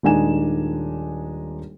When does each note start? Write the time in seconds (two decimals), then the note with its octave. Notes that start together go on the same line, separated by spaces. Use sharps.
0.03 D#1 G#3 D4 D#4 G#5 E7